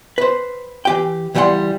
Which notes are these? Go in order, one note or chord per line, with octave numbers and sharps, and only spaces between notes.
B4 C5
E3 G4 G5
C#2 E3 G3 G4 F#5 C6